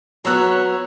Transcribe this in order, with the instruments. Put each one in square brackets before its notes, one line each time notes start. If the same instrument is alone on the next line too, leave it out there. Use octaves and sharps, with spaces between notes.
[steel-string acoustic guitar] F#3 B3 [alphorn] F#4 [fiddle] C#5 [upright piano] A#5 E6 F#6